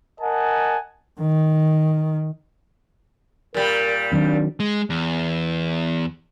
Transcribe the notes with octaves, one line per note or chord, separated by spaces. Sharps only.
A#4 D#5 F#5 G#5 A5
D#3
A#2 G3 A#4
D#3 F#3 C4 D4
G#3
E2